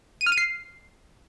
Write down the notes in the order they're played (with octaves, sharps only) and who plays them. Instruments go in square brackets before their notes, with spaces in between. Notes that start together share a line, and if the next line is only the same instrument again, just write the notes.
[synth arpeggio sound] D#7
F6
D#7
C7